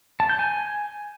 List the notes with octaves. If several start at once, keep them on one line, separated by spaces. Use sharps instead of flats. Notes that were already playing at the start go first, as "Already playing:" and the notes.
A5
G6
G#5